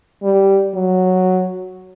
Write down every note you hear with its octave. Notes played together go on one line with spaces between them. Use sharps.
G3
F#3